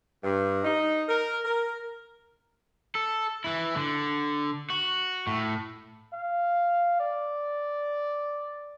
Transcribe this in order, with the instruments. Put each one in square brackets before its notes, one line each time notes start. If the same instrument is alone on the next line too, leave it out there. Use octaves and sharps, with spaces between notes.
[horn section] G2
D#4
A#4
A#4
[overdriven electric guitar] A4
E3 E4
D3
F#4
A2
[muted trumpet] F5
D5